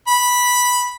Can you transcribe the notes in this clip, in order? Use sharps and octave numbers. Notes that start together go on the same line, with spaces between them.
B5